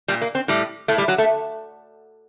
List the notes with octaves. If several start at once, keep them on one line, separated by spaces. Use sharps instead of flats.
A#2 G3
A#3
C4
A2 G3
A2 A3
G3
F#3
A3